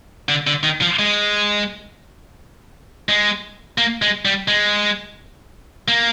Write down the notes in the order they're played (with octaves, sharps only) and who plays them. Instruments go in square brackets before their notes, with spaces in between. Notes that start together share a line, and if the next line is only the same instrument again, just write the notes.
[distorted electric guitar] D3
D3
D#3
F3
G#3
G#3
A#3
G#3
G3
G#3
A#3